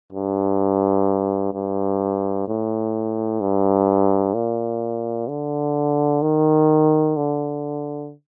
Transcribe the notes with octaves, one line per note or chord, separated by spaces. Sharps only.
G2
G2
A2
G2
A#2
D3
D#3
D3